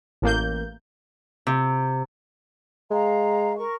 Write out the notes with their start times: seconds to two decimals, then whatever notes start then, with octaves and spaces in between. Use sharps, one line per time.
0.22 A1 A#3 G6
1.47 C3
2.91 G#3 F5 A#5
3.56 A#4 C#6